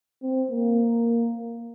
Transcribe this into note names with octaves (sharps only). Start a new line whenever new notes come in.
C4
A#3